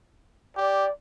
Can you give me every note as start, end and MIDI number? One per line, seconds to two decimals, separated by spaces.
0.57 0.86 67
0.57 0.91 74